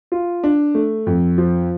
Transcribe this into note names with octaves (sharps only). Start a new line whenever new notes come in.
F4
D4
A3
F2
F3